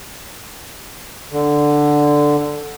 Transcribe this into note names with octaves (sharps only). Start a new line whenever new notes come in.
D3